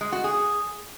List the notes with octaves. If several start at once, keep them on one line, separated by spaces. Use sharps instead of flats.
G#3
F#4
G#4